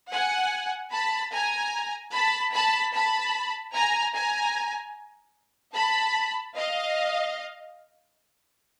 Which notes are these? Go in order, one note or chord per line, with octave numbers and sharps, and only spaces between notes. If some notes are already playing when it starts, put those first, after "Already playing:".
F#5 G#5
A5 B5
G#5 A#5
A5 B5
A5 B5
A5 B5
G#5 A#5
G#5 A#5
A5 B5
D#5 F5